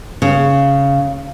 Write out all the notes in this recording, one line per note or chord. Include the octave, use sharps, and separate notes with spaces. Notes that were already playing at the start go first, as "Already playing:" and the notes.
C#3